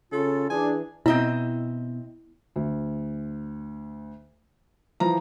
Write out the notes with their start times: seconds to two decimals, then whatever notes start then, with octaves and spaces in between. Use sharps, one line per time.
0.12 C#3 F4 A4
0.50 E3 D4 G#4 G#5
1.06 B2 C4 E4 D#5 E5
2.56 D2
5.00 E3 F3 A#5